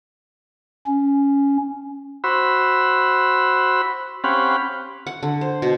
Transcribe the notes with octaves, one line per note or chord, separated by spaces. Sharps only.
C#4
F#4 C5 B5 E6
C4 C#4 G4 F5 F#5 B5
F#5
D3
C5
B2